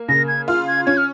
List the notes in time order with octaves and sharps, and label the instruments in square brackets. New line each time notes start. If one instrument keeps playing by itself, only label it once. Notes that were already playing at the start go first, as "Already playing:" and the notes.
Already playing: [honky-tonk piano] A#3
[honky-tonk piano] C#3 [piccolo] A#6
[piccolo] G#6
[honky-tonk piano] F4 [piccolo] F6
[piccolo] G#6
[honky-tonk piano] C#4 [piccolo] G#6
[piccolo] F6